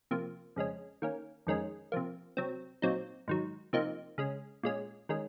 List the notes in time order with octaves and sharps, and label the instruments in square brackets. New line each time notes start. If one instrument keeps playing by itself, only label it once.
[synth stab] C3 F3 A#3
F2 C#3 G#3 C#4
D#3 A#3 C#4
F2 D#3 G#3 C#4
C3 F3 A#3
C3 F#3 C4
A#2 F#3 C4 D#4
G#2 D#3 F#3
C3 F3 A#3 D#4
C#3 G#3 C#4
A#2 G#3 C#4
D#3 G#3 C#4